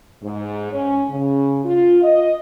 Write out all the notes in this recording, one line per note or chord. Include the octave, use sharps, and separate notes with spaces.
G#2
C#4
C#3
F4
D#5